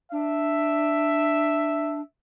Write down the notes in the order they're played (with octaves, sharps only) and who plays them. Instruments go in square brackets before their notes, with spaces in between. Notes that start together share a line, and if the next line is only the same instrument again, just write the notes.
[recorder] D4 [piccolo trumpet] E5